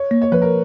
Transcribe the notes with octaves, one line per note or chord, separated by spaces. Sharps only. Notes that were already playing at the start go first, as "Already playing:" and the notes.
Already playing: C#5
A#3
C#5
F3 B4
A#4